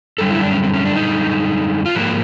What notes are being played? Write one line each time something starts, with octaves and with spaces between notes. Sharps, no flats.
F#2 D3 G3 A4
E4
D4
C#4
C4
C#4
D4
D#4
F4
G#2 F3 A#3 F#4